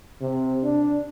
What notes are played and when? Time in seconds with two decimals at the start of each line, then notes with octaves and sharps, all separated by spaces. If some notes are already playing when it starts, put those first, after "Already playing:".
0.21 C3
0.64 D4